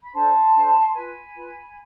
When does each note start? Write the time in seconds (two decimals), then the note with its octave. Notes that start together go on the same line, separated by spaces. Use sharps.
0.03 B5
0.14 D4 A4 C5 A5 C6
0.55 D4 A4 C5
0.94 F4 B4 G#5 B5
1.35 F4 B4